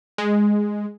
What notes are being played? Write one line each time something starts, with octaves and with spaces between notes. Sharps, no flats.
G#3